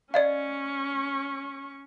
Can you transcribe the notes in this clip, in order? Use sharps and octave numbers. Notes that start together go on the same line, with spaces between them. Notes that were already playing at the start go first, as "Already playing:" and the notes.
C#4 D5 D#5 F5 C#6